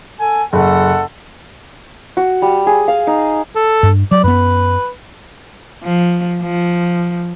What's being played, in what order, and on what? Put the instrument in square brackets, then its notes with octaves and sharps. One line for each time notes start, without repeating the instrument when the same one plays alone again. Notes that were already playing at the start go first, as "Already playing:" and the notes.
[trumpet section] A4 G#5
[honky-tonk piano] F#1 [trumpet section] A4 F#5
[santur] F#4
G3
G#4
F5
D#4
[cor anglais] A4
[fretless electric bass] G2
[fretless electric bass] F#3 [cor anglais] D5
[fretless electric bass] F#2 B3 [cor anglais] B4
[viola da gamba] F3
F3